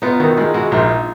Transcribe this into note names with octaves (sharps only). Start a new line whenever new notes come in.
B3 D#4 F4
D#3 E4 F#4
G#3 D#4 F4
G#3 E4 F#4
A#1 D#4 F4